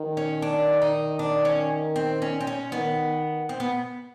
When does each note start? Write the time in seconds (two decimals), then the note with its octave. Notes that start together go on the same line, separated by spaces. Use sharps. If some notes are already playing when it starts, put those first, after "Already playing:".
Already playing: D#3
0.17 C#4
0.42 D4
0.82 D#4
1.19 D4
1.45 C#4
1.96 C4
2.22 C#4
2.41 C4
2.47 C#4
2.72 D#3 B3
3.49 C4
3.60 B3